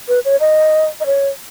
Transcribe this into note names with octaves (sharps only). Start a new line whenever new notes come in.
B4
C#5
D#5
D#5
C#5